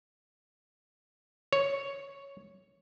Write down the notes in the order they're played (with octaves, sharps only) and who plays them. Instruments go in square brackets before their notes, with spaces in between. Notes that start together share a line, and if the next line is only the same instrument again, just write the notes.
[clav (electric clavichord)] C#5